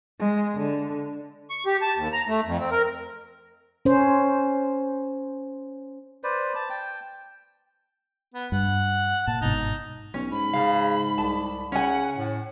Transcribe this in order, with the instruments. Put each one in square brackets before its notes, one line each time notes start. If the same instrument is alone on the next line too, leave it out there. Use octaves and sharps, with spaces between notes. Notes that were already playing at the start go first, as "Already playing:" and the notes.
[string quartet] G#3
D3
[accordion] C#6
G4
A5
D#2
A#5
A3
F2
C4
A#4
[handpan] C#4 C5
[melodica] B4 C5 D5
A5
G5
[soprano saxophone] B3
[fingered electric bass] G2 [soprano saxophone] F#5
[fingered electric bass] A#2 [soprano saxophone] A5
[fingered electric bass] G1 G#2 B2 [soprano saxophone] D#4
[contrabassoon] B1 [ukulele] C#4
[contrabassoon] G#2 [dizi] B5
[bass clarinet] C#3 [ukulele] F5
[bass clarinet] C2 [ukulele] A5
[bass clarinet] C#3 [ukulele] C#4 G#5 [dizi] F#5
[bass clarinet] A2